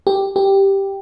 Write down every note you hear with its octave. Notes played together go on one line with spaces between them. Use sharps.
G4
G4